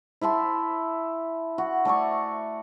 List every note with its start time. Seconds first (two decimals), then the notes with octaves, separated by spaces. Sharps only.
0.21 E4 E5 A5 C6
1.58 F#4
1.85 A3 D5 G#5 C#6